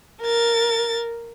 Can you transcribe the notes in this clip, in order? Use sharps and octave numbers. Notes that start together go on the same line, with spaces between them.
A#4 A6